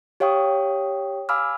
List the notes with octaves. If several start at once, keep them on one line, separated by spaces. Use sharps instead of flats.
G4 C#5 F5 G5 C#6 D#6
F5 G#5 B5 D6 E6 F6